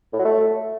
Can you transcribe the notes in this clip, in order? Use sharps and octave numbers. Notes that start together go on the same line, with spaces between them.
A2
F#3
A3